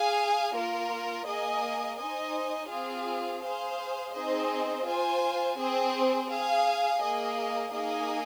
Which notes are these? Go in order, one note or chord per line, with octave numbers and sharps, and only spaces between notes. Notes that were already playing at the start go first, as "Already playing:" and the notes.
Already playing: G#4 F5 G#5
A#3 F4 A#4
A#3 G#4 D#5 G#5
D#4 C5 D#5 G#5
C4 F4 G#4 F5
G#4 C5 F5
C4 D#4 G#4 C5 D#5
F4 C5 G#5
C4 G#4 C5
G#4 F5 G#5
A#3 G#4 D#5
A#3 D#4 G#4 D#5 G#5